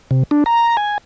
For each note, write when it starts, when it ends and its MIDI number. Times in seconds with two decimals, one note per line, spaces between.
0.11 0.23 48
0.31 0.44 62
0.46 0.77 82
0.77 0.98 80